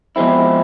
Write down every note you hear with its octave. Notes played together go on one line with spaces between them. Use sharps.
B2 F3 G#3 C4 E4